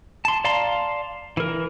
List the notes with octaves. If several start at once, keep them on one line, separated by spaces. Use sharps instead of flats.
A5 C6
D5 F5 A5 A#5 C6
E3 A#4